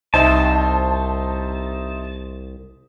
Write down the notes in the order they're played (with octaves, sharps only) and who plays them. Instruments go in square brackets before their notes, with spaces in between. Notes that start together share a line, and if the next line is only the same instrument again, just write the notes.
[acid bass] C2 [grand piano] D#4 C5 E5 [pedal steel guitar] A5